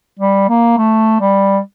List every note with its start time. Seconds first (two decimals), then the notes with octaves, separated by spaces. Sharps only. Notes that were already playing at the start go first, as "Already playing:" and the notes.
0.19 G3
0.49 A#3
0.78 A3
1.20 G3